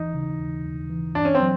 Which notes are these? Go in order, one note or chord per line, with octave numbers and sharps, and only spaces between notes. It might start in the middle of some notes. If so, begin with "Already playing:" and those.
Already playing: D#2 E3 D#4
C#3
D#2
D#2
E3
G2 D4
C#4
C4
F#3